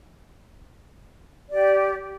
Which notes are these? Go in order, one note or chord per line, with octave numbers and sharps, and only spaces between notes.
G4 D5